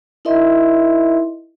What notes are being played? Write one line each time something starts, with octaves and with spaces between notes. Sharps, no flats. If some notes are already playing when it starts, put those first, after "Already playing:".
D#4 E4 A#4 D#5 E5 C6